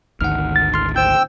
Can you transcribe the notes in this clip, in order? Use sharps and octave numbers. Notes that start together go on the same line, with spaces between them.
G#1 D2 D#3 F#5 F6
A6
C6 F6
C5 G5 E6 G6